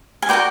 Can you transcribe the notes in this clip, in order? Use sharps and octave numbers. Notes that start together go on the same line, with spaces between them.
G#5
F#4 A#4 D5 G5